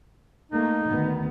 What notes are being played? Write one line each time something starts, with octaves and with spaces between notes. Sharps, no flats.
A3 A#3 D#4
D2 D#3 B3